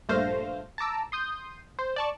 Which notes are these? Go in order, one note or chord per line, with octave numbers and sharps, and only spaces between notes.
A#1 G2 A3 C5 F5 A#6
A5 A#5 D6 E6
C6 D#6 G6
C5
D5 A5 C#6